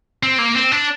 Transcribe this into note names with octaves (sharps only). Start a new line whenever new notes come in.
C4
A#3
C4
D4